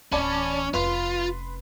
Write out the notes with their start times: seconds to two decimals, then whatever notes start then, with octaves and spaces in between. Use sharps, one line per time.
0.12 D1 E3 C#4 D5 A5 B5
0.74 F1 C#4 F4 B4 C6